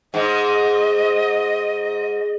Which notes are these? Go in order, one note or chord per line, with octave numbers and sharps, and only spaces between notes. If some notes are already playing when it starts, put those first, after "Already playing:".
G#2 D#5